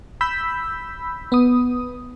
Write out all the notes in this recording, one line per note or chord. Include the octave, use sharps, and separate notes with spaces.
B5 E6 G6 B6
B3 D#6